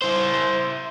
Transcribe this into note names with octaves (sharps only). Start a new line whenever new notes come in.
E4 C5